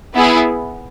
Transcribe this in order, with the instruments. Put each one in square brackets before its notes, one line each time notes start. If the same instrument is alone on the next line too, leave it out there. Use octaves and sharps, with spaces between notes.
[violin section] B3 E4 G#4